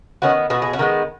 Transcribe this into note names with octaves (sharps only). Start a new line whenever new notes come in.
D#3 B3 C#4 F#4
B2 B3 F#4
G#4
C#4 F#4
D#3 G#3 B3